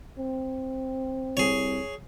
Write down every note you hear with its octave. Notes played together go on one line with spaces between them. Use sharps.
C4
C2 G#4 C#5